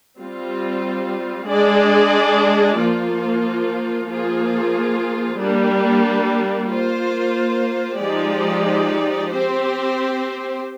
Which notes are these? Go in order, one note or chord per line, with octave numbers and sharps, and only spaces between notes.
G3 C4 F4
G#3 D4 G#4 D5
F3 A#3 F4
F3 A#3 F4 G#4
G3 A#3 D4
A#3 F4 C5
F3 G#3 D#4 G4 D5
C4 G4 C5